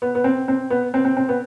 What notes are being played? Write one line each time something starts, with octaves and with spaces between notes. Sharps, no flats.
B3
B3
C4
C4
B3
C4
C4
C4
B3